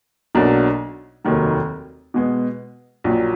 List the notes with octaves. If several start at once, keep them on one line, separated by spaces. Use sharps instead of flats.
B1 B2 F#3 A#3 D4
F1 D#2 D#3 F#3
B2 G#3 B3
A#1 A#2 F#3